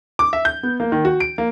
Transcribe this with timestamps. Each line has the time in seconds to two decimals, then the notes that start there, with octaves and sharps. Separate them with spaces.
0.19 D6
0.33 E5
0.45 G6
0.63 B3
0.80 A#3
0.92 D#3
1.05 F#4
1.20 D7
1.38 A#3